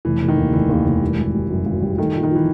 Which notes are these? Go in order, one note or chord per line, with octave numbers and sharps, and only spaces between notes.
F1 E3
F1
D#3
D#2
F1 E3
D#2
F1
G3
G#1
G3
F#2
G#1
G3
D#3 A3
A#2
D#3
E3 F3